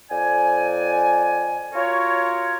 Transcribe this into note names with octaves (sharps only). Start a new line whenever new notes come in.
F2 D5 G#5
F4 F#4 A#4 C#5